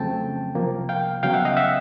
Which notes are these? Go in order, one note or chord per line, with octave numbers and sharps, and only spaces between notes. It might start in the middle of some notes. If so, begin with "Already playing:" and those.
Already playing: F2 C#3 F#3 A3 C4 G5 A5
C2 C3 F3 A#3
F5 G5
C#2 C#3 F#3 B3 F5 G5
E5 F#5
D#5 F5
E5 F#5